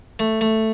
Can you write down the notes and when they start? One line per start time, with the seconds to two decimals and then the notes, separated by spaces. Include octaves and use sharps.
0.19 A3
0.41 A3